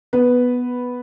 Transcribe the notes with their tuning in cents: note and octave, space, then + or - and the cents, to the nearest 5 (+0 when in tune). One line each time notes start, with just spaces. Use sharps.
B3 +0 B4 +0